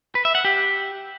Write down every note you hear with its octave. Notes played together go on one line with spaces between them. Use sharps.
B4
E5
F#5
G4